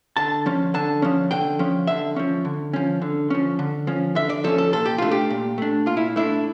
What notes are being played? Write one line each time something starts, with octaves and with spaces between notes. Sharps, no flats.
D3 A5
F3 C#4
D3 A5
F3 C#4
D3 G5
F3 C#4
D3 E5
F3 C#4
D3
F3 C#4
D3
F3 C#4
D3
F3 C#4
D3 E5
D5
F3 C#4 A4
A4
A#2 A4
G4
A3 D4 F4
G4
A#2
A3 D4
A#2 F4
E4
A3 D4 E4